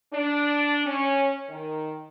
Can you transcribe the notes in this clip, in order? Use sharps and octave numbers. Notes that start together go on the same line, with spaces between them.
D4
C#4
D#3